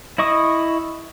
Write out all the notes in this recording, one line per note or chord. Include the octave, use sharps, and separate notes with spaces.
E4 D#5 C#6 D#6